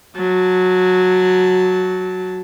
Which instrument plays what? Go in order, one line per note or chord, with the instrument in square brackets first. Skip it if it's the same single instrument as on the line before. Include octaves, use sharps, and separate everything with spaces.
[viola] F#3 A5